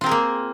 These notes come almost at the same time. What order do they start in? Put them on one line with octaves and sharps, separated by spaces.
F4 C4 A#4 G#4 A#3